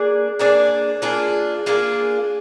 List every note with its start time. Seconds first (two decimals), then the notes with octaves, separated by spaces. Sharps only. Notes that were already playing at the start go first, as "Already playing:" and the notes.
Already playing: A#3 D4 G#4 D5
0.39 A#3 D4 G#4 D5
1.02 A#3 D4 F4 G#4
1.66 A#3 D4 F4 G#4